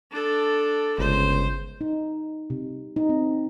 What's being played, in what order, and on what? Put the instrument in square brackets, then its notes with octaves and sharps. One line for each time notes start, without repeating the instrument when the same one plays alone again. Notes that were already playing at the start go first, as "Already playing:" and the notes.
[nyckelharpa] D4 A4
[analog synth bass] G1 [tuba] C#2 [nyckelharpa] C5
[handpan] D#4
C3
D#4
C4